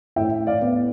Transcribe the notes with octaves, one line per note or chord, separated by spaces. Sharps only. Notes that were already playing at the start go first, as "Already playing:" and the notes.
A2 E5 G5
D5 F5
B3